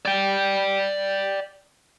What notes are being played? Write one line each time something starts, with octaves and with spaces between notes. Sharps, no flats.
D5 G5